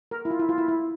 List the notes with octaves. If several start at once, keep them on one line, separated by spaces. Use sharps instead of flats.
A#4
E4
F4
E4
F4
E4
E4